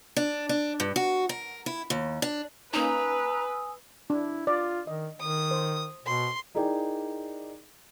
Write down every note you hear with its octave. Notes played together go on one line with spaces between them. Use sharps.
D4
D4
G2
F#4
A#4
E4
D#2
D4
A#3 C#4 D#4 B4 G#5 A#5 D#6 E6
D4 E4
F4 D5
D#3 D#5
D#3 D#6
C5
B2 C6
D#4 E4 G#4 A#4 D5 G5